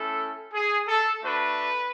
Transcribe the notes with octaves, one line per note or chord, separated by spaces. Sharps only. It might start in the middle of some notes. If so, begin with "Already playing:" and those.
Already playing: A3 C#4 E4 A4
G#4
A4
A3 D4 F#4 B4